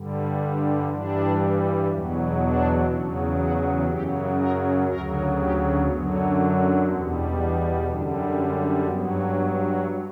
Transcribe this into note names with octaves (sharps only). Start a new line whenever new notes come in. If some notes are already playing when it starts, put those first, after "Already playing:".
Already playing: G2 D3 G3
G2 E3 G3 D4
E2 B2 F#3
D4
E2 C#3 F#3
F#4
F#2 C#3 F#3 G4
A#4
D2 C#3 F#3 A#4
G4
F#2 D3 F#3 B3
E2 B2 G3 B3
D4
F#2 D3 G3 D4
C#4
G2 F#3 B3
B3